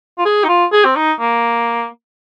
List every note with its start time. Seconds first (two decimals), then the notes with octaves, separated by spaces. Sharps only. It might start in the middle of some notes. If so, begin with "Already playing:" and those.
0.18 F4
0.25 G#4
0.44 D#4
0.48 F4
0.72 G#4
0.85 C4
0.96 D#4
1.20 A#3